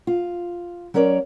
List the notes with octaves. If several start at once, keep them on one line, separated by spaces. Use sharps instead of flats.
F4
F#3 C#4 A#4 C#5 D5